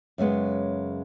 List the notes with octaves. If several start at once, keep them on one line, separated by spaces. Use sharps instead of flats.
F#2 C#3 G#3 B3